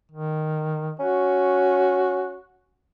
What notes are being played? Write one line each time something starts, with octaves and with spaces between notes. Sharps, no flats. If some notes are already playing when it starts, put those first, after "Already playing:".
D#3
C#4 F#4